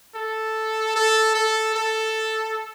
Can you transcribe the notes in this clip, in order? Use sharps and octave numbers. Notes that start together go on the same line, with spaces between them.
A4
A4
A4
A4